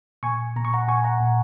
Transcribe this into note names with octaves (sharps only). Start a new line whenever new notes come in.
A#2 G#5 C#6
A#2 A#5
C#6
F#5 A#5
A#2 G#5 C#6
F#5 A#5
A#2